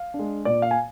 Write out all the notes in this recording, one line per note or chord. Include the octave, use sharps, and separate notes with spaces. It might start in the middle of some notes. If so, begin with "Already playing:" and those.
Already playing: F5
D4
G#3
A#2 D5
F5
G#5